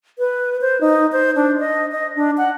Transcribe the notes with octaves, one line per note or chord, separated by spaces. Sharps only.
B4
C5
D#4
C5
D4
D#5
D#5
D4
F#5